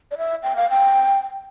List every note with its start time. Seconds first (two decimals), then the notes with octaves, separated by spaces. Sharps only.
0.11 D5
0.18 E5
0.43 G5
0.56 F5
0.70 G5